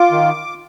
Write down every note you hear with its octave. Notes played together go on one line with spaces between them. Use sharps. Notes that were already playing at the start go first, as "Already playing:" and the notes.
Already playing: F4 D6
D#3